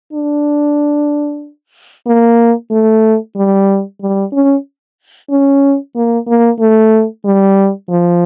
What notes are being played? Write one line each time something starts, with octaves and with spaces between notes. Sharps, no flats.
D4
A#3
A3
G3
G3
C#4
C#4
A#3
A#3
A3
G3
F3